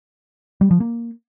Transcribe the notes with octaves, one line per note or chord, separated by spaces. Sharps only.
G3
F3
A#3